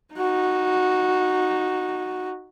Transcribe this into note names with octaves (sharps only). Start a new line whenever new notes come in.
D#4 F#4